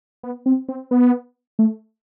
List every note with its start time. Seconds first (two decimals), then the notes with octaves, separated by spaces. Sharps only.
0.23 B3
0.46 C4
0.69 C4
0.91 B3
1.59 A3